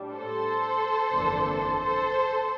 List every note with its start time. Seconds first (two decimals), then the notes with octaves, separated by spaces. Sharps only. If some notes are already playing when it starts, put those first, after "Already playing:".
Already playing: A2 G3 D4
0.12 A4 C5
1.13 G1 F2 E3 A#3 D4
1.80 A4 C5